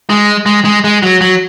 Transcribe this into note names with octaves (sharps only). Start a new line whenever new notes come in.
G#3
G#3
G#3
G#3
F#3
F#3